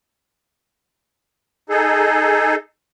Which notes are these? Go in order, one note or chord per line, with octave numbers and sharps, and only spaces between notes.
D#4 G#4 A4